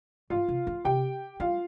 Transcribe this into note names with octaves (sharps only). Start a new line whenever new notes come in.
G#2 F4 F5
C3
G#2
C3 G4 G5
G3 F4 F5